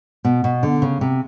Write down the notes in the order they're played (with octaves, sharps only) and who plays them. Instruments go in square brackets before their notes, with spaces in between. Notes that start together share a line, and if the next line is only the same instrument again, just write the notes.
[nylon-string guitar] B2
B2
D3
C#3
C3